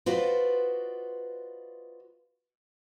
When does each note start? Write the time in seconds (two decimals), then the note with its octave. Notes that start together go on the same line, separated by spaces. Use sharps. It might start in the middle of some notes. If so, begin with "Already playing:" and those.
0.06 F4 F#4 B4 C5 D5 D#5